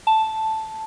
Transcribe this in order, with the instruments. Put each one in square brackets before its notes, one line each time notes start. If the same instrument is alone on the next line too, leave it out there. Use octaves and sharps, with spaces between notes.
[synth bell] A5